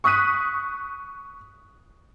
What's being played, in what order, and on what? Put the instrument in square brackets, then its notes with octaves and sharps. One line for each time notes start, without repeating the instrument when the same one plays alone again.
[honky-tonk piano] C#6 D#6 F#6 B6 D#7